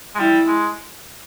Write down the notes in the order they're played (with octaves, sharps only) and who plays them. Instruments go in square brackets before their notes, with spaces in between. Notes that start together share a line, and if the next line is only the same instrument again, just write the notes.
[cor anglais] G#3
[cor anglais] G3 [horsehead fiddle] E4
[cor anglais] G#3